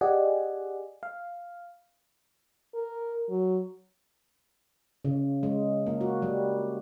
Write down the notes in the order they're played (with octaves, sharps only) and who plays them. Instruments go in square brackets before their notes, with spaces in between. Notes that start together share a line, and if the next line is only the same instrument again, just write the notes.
[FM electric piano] G4 G#4 D5 D#5 F#5 G#5
F5
[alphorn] A#4
F#3
[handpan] C#3
G#3
A#3
F#4
G3